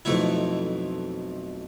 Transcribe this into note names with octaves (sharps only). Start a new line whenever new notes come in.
B1 F2 A3 E4